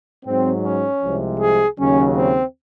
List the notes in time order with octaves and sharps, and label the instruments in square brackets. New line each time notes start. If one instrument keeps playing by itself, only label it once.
[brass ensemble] G#2 F#3 C4
C#4
C2 C3 F3 G#3
G#4
D#2 C#3 F#3 C#4
C4